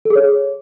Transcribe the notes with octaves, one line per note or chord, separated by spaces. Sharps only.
A4
G#4
C#5